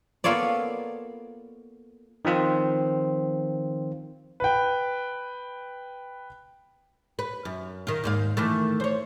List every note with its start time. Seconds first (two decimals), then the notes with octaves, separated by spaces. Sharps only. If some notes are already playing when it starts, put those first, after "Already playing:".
0.24 A#3 B3 F4 A4 C#5 D5
2.25 D#3 F3 C4 F4
4.40 B4 G5
7.19 B4
7.45 F#2
7.87 D#3 F4
8.04 D#2 G#2 F5
8.37 D#3 E3 A3
8.80 C5 C#5